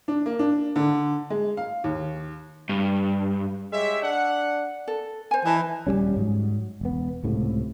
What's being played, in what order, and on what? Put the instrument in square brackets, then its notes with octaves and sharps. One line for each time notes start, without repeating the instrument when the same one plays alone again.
[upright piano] D4
A#3
D4
D3
G#3
F5
D#2
[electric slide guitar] G2
[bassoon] G#3 [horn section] G4 C#5 E5
[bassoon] D4 [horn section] F#5
[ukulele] A4
C5 G#5
[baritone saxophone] E3 [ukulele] D#5 E5 A5
[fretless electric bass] D#1 G#2 G3 C#4
G#2 F#3
E1 B3
C#2 A2 C3